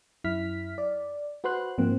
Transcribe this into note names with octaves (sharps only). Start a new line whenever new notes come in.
F#2 E4 F6 B6
D5
F#4 B4 C5 C6 F#6
G#2 F3 A#3 C4